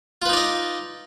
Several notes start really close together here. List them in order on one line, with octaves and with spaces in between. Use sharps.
F4 B4 D#4 D5 D#5